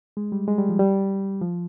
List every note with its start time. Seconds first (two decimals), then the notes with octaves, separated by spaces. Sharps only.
0.17 G#3
0.32 G3
0.47 G#3
0.58 G3
0.69 F3
0.79 G3
1.41 F3